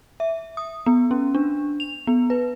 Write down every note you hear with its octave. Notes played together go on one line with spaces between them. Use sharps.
E5
D#6
B3
C#4
D4
F7
B3
B4